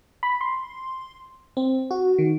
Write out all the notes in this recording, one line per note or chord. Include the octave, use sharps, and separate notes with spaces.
B5
C6
C4
F#4
D#3